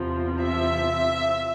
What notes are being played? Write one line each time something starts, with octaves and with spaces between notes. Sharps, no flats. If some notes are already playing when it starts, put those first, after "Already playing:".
Already playing: E2 C3 F3
E5